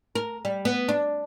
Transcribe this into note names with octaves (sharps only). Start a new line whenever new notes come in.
A#4
G3
B3
D4